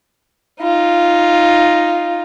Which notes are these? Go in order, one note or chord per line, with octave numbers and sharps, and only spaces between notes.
D#4 F4